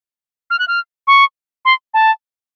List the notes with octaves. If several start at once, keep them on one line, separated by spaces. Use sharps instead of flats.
F6
F#6
F6
C#6
C6
A5